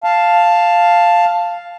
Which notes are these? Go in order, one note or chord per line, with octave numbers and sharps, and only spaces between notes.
F5 A5